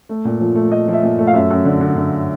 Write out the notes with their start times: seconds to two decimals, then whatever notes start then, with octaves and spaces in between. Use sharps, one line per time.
0.09 A3
0.25 A#2
0.41 F3
0.55 A3
0.71 A3 D#5
0.88 F3
0.93 E5
1.03 A#2
1.19 A3
1.27 F5
1.34 F#2 E5
1.51 F#2
1.65 D3
1.81 D3
1.96 D3